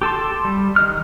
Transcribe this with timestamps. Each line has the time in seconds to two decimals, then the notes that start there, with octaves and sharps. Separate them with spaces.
0.02 G4 A4 A5 C6
0.45 G3
0.76 D#3 D#5 F6